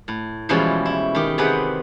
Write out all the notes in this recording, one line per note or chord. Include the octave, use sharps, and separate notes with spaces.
A2
B2 E3 F3 G3 G#3 C#4
E4
D#3 G4
C3 B3 G#4 B4 F#5 G5